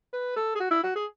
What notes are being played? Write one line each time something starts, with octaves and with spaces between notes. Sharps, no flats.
B4
A4
G#4
F#4
E4
F#4
G#4